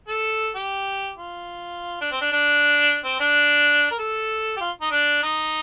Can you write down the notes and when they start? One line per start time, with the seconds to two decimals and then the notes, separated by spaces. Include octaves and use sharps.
0.08 A4
0.56 G4
1.17 F4
2.01 D4
2.12 C4
2.21 D4
2.32 D4
3.05 C4
3.20 D4
3.91 A#4
3.99 A4
4.57 G4
4.61 F4
4.81 D#4
4.91 D4
5.23 D#4